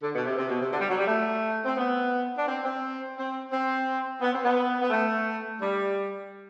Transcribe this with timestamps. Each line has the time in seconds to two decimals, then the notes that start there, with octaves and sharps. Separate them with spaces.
0.02 D3
0.14 B2
0.25 C3
0.37 C3
0.48 B2
0.60 C3
0.71 D3
0.80 G3
0.89 F#3
0.98 G3
1.07 A3
1.65 C4
1.77 B3
2.37 D4
2.47 C4
2.63 C4
3.16 C4
3.51 C4
4.21 B3
4.32 C4
4.43 B3
4.81 B3
4.90 A3
5.60 G3